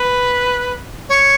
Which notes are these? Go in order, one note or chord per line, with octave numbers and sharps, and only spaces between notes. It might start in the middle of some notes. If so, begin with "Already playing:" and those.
Already playing: B4
C#5